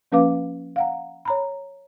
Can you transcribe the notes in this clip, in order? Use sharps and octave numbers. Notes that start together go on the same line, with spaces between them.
F3 A#3 C#4 B4 F5 D6
F5 F#5 A#5
C#5 A#5 B5